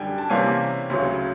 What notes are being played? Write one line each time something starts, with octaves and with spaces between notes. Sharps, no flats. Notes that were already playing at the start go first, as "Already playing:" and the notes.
Already playing: F#2 D3 G3 G5 G#5
A5
C3 E3 G3 A#3 C#4 G#5
D2 C#3 F#3